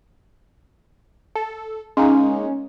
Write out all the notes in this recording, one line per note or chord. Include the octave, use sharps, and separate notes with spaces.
A4
G#3 A#3 C#4 D#4